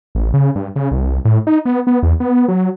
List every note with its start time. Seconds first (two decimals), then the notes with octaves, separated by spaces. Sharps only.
0.15 A1
0.34 C#3
0.55 G2
0.76 C#3
0.91 C2
1.25 A2
1.47 D#4
1.65 B3
1.87 B3
2.03 E2
2.20 B3
2.48 F#3